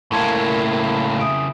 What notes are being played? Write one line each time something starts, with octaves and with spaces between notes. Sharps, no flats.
A2 C#3 A#3 E4 A5 C6 G#6
E5 D#6 D7